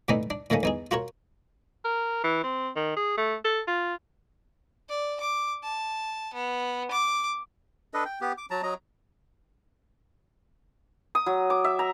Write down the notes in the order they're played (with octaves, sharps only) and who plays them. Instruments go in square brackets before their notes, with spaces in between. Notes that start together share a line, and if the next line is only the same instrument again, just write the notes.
[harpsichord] A2 C3 E3 A3 D4 D#4
D4
A#2 D#3 A3 A#3 C#4
E2 D#4 G#4
F4 F#4 A#4 C#5
[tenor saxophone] A#4
E3
C4
D#3
G#4
A3
A4
F4
[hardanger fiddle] D5
D6
A5
B3
D6
[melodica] D4 A4 B4 D#5
G5
B3 G4
D6
F#3 A5 A#5
F#3 D#5 A#5
[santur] D#6
F#3
D6
E5
A#5